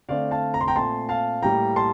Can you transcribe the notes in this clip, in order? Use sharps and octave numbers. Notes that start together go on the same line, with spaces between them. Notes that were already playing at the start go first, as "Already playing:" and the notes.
D3 A3 C4 D5 F5
F5 A5
A#5
C6
G5 A#5
A#2 A3 C4 A5 C6
F5 A5
A2 G3 A#3 G5 A#5
A5 C6